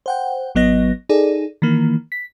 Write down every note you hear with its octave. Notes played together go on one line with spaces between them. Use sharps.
C5 F#5 G5
G#1 F#3 B3 D#5 A#6
D#4 G#4 A4 D5
D#3 E3 A#3
B6